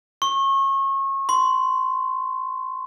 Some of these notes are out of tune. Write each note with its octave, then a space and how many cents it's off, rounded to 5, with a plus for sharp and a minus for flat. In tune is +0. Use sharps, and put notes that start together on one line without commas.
C#6 -30
C6 -20